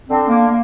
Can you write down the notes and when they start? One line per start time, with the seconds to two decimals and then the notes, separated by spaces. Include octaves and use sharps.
0.08 D3 C4
0.28 A#3
0.47 A#3